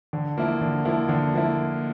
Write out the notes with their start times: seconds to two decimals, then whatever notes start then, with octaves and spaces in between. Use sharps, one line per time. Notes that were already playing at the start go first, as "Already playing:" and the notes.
0.13 D3
0.37 F3 A#3 E4
0.61 D3
0.85 F3 A#3 E4
1.09 D3
1.34 F3 A#3 E4